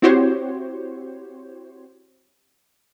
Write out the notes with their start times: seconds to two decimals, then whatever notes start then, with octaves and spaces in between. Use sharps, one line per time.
0.02 C4 E4 F#4 G4 C5 C#5